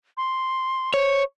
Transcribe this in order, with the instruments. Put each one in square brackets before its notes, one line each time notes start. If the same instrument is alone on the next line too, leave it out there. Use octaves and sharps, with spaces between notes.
[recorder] C6
[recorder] C5 [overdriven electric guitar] C#5